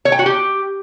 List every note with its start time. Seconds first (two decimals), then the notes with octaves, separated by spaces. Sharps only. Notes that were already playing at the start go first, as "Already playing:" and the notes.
0.05 C#5
0.12 G5
0.19 F#4
0.26 G4